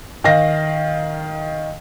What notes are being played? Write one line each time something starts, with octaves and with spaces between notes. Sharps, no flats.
D#3 F5 A#6